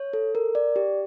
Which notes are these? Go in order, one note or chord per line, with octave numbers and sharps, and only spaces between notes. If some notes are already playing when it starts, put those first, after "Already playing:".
Already playing: C#5
A4
A#4
D5
G4